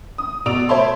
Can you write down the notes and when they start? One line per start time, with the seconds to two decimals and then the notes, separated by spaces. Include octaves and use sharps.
0.18 D#6
0.46 B2 D5 E6 D7 F7
0.69 C5 C#5 E5 A5 B5 C6